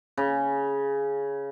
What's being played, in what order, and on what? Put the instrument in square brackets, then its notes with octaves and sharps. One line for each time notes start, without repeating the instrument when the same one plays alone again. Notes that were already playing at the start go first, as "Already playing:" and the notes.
[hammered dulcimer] C#3